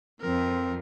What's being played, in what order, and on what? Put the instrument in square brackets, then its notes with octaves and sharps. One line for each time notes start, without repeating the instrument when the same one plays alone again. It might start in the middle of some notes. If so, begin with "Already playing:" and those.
[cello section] F2 F3 [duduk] C4 [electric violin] A#4